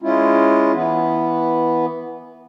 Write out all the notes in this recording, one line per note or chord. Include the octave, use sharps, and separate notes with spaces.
G#3 C#4 E4 F4
E3 B3